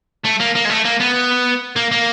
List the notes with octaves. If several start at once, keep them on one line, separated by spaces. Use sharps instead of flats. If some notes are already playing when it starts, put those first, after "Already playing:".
A3
A#3
A#3
G#3
A3
A#3
B3
A#3
A#3